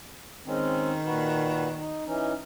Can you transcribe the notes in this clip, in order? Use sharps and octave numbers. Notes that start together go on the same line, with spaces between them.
D#3 G#3 C4 C#4
A#2 F#4 B4
D#4
E3 C#4 D#4